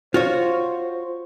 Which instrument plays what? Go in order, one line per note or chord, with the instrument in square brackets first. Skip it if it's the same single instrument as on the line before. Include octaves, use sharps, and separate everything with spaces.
[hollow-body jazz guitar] F4 F#4 C#5 [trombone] C5